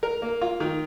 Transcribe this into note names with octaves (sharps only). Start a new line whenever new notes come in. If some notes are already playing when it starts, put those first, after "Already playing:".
A#4
A#3
F4
D#3